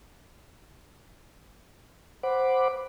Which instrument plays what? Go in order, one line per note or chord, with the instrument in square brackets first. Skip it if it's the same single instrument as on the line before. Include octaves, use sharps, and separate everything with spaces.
[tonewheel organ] C5 F#5 B5 D6